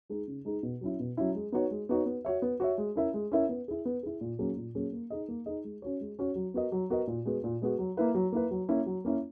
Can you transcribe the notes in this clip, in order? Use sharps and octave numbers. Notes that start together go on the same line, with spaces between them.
G#3 D#4 G#4
C#3
G#3 D#4 G#4
B2
F#3 C#4 E4
B2
F#3 C#4 E4
G#3
B3 D#4 F#4 C#5
G#3
B3 D#4 F#4 C#5
B3
F#4 C#5 E5
B3
F#4 C#5 E5
G#3
C#4 E4 A#4 E5
G#3
C#4 E4 A#4 E5
B3
E4 G#4
B3
E4 G#4
A#2
F#3 A#3 C#4 G#4
A#2
F#3 A#3 C#4 G#4
A#3
D#4 G#4 D#5
A#3
D#4 G#4 D#5
G#3
C#4 F#4 C#5
G#3
C#4 F#4 C#5
F#3
B3 F#4 A#4 D#5
F#3
B3 F#4 A#4 D#5
A#2
G#3 B3 F#4
A#2
G#3 B3 F#4
F#3
A#3 E4 B4
F#3
A#3 E4 B4
F#3
A#3 C#4 E4
F#3
A#3 C#4 E4